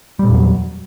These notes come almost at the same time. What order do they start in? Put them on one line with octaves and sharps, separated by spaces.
G3 A#2 E2 F#3